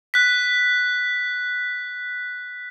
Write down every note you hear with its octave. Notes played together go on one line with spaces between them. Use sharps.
F#6 B6